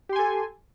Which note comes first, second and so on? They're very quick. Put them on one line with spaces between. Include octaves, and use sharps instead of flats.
G4 C6 G#5 A4